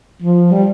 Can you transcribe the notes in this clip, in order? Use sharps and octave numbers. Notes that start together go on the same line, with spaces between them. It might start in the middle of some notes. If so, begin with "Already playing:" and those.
F3
G3